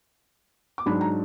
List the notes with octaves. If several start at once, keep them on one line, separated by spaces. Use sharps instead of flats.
D6
G#2 F#3 D4 B5
A#5